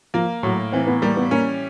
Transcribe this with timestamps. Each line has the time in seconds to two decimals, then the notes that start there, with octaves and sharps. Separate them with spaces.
0.14 F3 A#3
0.43 A2 F#3
0.73 E3 C4
0.87 B3
1.02 G3 A#3
1.17 B3
1.31 A#3 C#4